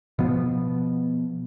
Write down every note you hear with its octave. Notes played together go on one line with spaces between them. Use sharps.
B2 F3 B3